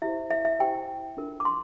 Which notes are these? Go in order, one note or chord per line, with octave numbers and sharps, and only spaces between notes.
E4 G4 C5 E5
E5
E5
E4 G4 C5 G5
D4 F4 A#4
D6
C6